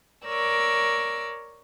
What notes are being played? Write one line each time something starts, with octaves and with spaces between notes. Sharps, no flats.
A#4 C#5 D5 E6